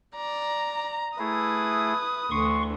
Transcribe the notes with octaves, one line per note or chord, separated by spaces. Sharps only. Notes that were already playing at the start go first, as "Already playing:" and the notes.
D5 A#5
A3 E4 G#4 B4 D#6
D2 D3 E3 C6 C#6